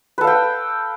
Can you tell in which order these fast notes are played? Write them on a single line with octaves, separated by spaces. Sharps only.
B4 A4 F5 G5